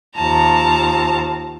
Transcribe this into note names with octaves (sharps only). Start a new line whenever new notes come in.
D#2 F3 A5 A#5